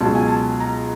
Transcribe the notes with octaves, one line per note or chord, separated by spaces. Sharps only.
C#2 B2 F#3 A5
G#5
A5
A#5